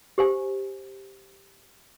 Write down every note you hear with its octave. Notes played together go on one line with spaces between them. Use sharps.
G4 C5 G#5